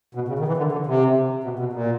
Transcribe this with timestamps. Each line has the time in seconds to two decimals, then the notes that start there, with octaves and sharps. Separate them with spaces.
0.15 B2
0.28 C#3
0.39 D#3
0.47 E3
0.57 D3
0.72 D3
0.86 C3
1.44 B2
1.59 B2
1.73 A#2